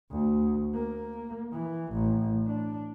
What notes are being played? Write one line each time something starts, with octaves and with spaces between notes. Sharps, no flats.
D2
A#3
E3
A1
D4